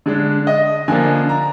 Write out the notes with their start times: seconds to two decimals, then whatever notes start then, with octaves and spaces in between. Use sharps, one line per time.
0.06 D3 G#3 D4
0.47 D#5
0.88 D3 F3 A#3 D4 G#5
1.29 A#5